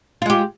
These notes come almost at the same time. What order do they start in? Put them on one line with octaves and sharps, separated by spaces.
F4 G#3 G4